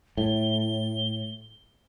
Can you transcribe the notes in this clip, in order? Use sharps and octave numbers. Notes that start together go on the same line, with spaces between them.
A2 G7